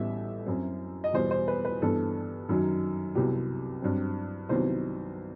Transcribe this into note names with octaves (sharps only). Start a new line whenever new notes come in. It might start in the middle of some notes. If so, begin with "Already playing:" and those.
Already playing: A1 A2 G3 B3 E5
F#2 F#3 C4
D#5
E2 B2 G3 B3 C5
C5
B4
B4
G2 E3 B3 A4
F#2 D#3 F#3
C2 C3 F#3 B3 G4
G2 F#3 C4
C2 C3 D#3 F#3 B3 C5